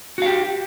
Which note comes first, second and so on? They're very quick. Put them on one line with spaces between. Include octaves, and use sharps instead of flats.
F#4 F5 G4